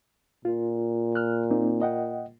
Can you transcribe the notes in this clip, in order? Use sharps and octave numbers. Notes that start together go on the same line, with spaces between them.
A#2 F4
F6 F#6
A#3 C4 D#4
D#5 F#5 G5